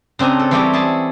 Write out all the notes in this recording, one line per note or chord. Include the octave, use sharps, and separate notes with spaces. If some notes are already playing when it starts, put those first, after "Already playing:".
C#3 C4 D4 G#5 A#5
A4
E3 G3 C4 G4 C#5 D5
E4 G#4 A4 A5